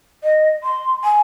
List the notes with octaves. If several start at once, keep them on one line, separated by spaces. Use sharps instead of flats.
D#5
C6
G#5